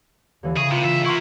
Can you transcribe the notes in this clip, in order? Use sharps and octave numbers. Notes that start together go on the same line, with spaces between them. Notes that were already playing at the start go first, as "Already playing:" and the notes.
D#2 D3 E3
C#3 G#4 C#6 A#6
C3 A#3 F4
G2 E5
E4 A#4 F#5 C6 C#6